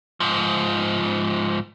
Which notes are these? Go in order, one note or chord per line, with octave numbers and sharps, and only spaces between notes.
G#2 F3